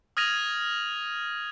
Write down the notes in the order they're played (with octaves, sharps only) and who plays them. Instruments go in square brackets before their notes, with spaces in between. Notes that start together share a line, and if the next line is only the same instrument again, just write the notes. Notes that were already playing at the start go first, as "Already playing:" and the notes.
[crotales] D#6 F6 G#6 A#6 D#7 F7